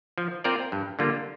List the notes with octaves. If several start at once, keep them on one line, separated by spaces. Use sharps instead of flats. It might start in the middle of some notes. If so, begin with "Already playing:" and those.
F3
C4 F4 A#4 D5
G2
D3 G3 A#3 F4